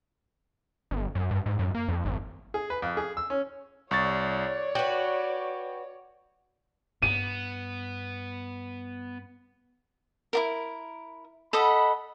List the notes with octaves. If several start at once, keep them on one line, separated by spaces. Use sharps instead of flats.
G1
F#2
G2
G#2
F#2
A#3
F2
G#1
G#4
B4
F2
G#4
E6
C#4
C2 C#5 D5 C#6 A6
F#4 B4 G5
G2 B3 D#7
E4 F4 A#4
A4 D#5 F#5 B5